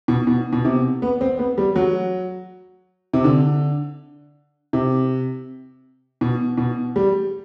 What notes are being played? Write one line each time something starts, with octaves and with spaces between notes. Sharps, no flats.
B2
B2
B2
C3
B3
C4
B3
G3
F#3
C3
D3
C3
B2
B2
G3